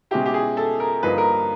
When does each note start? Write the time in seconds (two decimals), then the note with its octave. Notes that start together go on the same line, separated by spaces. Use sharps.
0.11 B2 G#3 C#4 E4 G4
0.26 G4
0.34 G#4
0.57 A4
0.80 A#4
1.03 G2 D3 F3 A#3 D#4 B4
1.18 A#4